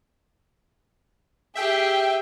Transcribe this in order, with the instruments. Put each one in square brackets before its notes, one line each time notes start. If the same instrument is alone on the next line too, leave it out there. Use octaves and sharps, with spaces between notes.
[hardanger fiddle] G4 G#4 [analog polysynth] E5 G5